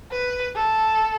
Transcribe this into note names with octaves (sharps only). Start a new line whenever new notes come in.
B4
A4